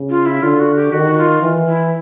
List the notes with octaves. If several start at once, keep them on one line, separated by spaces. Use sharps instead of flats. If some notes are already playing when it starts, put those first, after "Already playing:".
Already playing: C#3
F4
E4
D3 F4
F#4
G4
D#3 F#4
F4
E3
E4